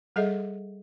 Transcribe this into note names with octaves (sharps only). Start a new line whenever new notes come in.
G3 G#4 A4 D#5 E5